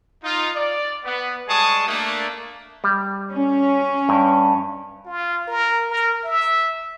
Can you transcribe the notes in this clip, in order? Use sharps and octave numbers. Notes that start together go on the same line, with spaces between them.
D#4 F4
D5
B3
G3 G#3 G#4 A5 C#6 D#6
A3 A#3 D4
G3
C#4
G2
F4
A#4
A#4
E5